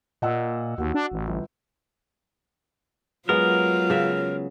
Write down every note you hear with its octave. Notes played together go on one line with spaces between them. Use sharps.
A#2 D#5 F#5 E6
D#2 F#4
D4
A1
G1
F#3 G#3 B3 F4 A#4
C#3 E5